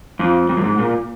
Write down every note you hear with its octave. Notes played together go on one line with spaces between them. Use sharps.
F2
F2
F#2
G#2
A#2